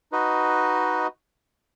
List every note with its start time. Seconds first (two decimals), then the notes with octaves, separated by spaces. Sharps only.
0.12 D#4 F#4 B4 D#5